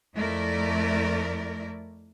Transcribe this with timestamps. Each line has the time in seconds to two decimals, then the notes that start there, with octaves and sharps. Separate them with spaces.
0.15 F2 A3 E4 A#4 D5